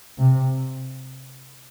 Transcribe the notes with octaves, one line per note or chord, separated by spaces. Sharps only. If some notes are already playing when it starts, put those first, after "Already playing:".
C3